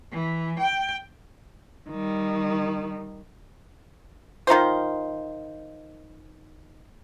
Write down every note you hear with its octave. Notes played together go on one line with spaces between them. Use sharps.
E3
G5
D#3 G3
D#3 D#4 F4 C5